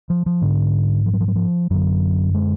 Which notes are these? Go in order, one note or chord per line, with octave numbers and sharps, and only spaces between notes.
F3
F3
G#2 D3
F3
F#3
F3
F#3
F3
F#2 D3 F#3
G#3